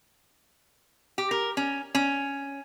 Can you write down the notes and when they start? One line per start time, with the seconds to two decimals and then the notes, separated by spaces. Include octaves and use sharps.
1.18 G4
1.31 A#4
1.57 C#4
1.95 C#4